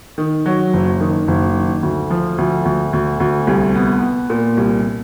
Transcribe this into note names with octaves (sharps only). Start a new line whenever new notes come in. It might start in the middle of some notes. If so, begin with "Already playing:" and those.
D#3
F#3
F#1
D#3
F#1
D#3
D2
F3
D2
D2
D2
D2
C2
B3
B3
A#2
C2